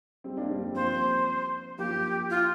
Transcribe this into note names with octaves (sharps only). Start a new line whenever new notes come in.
G3 C4
A#3 D4
G3 C4
G3 C4
F3 A#3 C5
F3 A#3 G4
F4